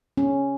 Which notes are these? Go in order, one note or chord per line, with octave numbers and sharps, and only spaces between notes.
C#4